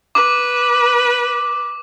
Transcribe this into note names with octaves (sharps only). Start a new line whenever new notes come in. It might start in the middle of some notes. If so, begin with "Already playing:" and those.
B4 D6